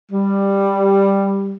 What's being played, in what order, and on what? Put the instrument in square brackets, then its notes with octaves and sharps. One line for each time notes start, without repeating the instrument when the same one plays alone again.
[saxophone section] G3